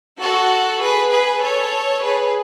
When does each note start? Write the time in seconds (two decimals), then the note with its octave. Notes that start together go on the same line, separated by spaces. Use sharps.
0.19 F#4 A4
0.81 G#4 B4
1.10 G#4 B4
1.41 A4 C#5
2.02 G#4 B4